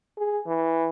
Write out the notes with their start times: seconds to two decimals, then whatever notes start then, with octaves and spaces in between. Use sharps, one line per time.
0.18 G#4
0.47 E3